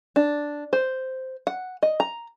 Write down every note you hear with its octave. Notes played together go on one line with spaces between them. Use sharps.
D4
C5
F#5
D#5
A#5